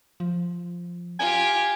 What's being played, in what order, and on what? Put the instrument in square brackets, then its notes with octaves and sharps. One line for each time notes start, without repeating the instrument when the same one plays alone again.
[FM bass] F3
[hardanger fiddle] F4 G4 [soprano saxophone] G#5